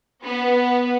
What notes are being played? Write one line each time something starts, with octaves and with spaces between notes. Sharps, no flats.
B3